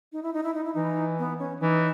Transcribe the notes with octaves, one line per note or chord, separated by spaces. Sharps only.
D#4
E4
D#4
E4
D#4
E4
E3 D#4
B3
C#4
E3 D#4